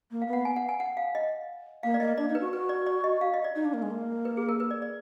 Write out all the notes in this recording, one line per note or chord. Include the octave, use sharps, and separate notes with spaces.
A#3
F5
B3
F#5
G#5
F#5
G#5
F#5
F5
D#5
A#3 F5
D5
A#3 D#5
D4 D5
D#4
B4
F#4
F#4 B4
D5
D5
D#5
F5
D#5
D5
D#4
D4
A#3
G#3
A#3
B4
G#4
A#4
B4
D5
D5